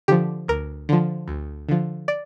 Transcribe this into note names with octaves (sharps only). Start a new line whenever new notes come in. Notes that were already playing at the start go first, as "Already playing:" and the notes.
D3 F3 G4
D2 A#4
D3 F3
D2
D3 F3
D5